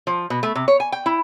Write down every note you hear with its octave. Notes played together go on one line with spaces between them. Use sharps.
F3
B2
A3
C3
C#5
G#5
G5
E4